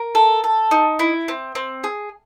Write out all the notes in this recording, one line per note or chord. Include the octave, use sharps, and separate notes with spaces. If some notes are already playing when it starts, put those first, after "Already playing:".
Already playing: A#4
A4
A4
D#4
E4
C4
C4
G#4